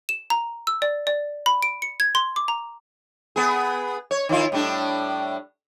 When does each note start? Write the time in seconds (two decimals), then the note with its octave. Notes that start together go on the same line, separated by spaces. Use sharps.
0.09 E7
0.30 A#5
0.67 E6
0.82 D5
1.07 D5
1.46 B5
1.62 D7
1.82 C#7
2.00 G#6
2.15 C6
2.36 D6
2.48 A#5
3.36 B3 G#4
4.11 C#5
4.29 D#3 E4 F4
4.52 A2 G3 D4